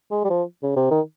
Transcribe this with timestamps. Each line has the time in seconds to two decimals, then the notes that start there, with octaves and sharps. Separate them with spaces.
0.11 G#3
0.24 G3
0.30 F3
0.63 C#3
0.76 C3
0.91 D#3